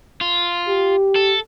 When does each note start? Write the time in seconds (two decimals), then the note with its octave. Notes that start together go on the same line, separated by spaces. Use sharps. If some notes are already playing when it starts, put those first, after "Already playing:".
0.21 F4
0.68 G4
1.15 A4